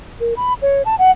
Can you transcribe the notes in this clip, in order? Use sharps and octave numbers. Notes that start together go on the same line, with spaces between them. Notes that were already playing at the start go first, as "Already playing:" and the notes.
A#4
B5
C#5
A5
F#5